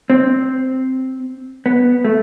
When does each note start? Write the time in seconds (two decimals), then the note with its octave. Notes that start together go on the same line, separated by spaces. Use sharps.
0.10 C4
1.66 B3
2.05 A3